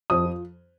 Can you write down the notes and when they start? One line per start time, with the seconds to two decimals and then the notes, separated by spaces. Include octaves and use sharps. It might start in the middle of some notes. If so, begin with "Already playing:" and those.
0.10 F2 D#6
0.26 F3